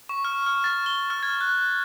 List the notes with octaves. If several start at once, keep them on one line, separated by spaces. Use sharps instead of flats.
C#6
F6
F6
A6
G7
F6
G#6
F#6